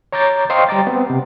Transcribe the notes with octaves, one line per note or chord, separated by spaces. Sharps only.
C#5 A#5 D6 G6 A6
C5 D#5 F5 G5 C6 C#6
G3 G5 A#5 D6 A6
B3 C4
C3